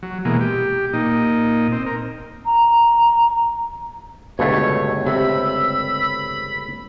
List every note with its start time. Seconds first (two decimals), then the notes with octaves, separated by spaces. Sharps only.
0.03 F#3
0.25 B2 E3 G#3 A#3
0.40 G4
0.93 A#2 D#4
1.72 C4
1.86 A#4
2.45 A#5
4.39 G1 C#2 B2 A3 C#5
5.06 C3 B5 E6